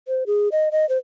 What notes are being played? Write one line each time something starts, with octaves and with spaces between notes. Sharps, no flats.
C5
G#4
D#5
D#5
C5